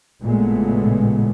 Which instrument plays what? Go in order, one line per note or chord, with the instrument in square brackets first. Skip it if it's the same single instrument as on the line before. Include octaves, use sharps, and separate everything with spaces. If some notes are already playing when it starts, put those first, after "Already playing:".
[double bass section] A1 A#2 C#3 G#3 A3 B3